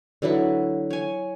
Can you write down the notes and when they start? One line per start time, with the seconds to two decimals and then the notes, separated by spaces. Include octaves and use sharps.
0.22 D3 F#3 E4 B4
0.90 C#5 G#5